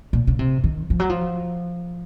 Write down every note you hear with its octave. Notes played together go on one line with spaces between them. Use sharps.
A#2
C#3
C3
D#3
F3
F#3
F3